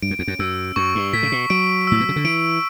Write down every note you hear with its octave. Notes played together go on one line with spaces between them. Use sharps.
G2 D7
F#2
E2
F#2
F#2 E6
F#2 C#6
G2
A2 B6
C#3
B2
F#3 D7
A2 E6
B2
C#3
D3
E3 D7